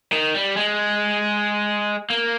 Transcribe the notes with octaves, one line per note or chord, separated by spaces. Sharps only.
D#3
G3
G#3
A#3